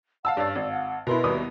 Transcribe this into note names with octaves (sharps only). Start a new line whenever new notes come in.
F5 F#5 A5 E6
G2 C#5 D5 A6
G#1 D5
F#5
B2 E4 A#4 B4 C6
D#2 G3 D#6